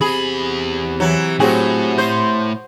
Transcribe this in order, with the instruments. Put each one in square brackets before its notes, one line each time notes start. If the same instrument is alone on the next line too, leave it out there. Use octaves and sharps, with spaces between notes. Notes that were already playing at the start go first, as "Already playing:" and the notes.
[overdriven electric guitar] E2 B5 [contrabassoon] C3 [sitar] G#4
[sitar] E3 F#3
[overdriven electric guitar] A2 [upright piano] F#3 C4 G#4 [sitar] F#4
[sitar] C5 [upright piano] G6